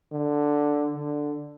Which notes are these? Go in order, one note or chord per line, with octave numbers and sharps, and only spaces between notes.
D3
D3